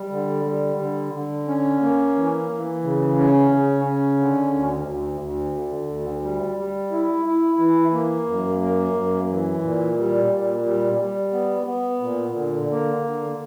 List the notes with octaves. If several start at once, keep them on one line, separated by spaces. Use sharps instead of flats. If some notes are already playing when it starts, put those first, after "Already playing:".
Already playing: G3
D3
G3
D3
D3
C#4
A#3
E3
E3
C#3
C#4
C#3
C#4
D3
D2
D2
D2
D3
D2
G3
G3
E4
E4
E3
A#3
F#2
A#3
F#2
E3
A#2
G3
A#2
G3
G3
B3
B3
A#2
D3
A#3
D3